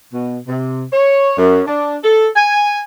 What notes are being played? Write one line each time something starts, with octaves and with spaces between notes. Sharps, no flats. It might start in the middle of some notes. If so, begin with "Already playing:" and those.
B2
C3
C#5
F#2
D4
A4
G#5